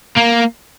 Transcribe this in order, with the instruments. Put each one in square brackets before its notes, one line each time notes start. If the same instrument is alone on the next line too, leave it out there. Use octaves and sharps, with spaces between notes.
[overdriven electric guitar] A#3